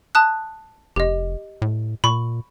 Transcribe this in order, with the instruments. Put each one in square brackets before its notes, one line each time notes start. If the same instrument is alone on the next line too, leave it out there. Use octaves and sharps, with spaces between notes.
[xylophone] A5 D#6 F#6
[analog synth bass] F1 [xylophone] G4 D#5
[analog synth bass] A2
[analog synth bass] A#2 [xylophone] B5 C#6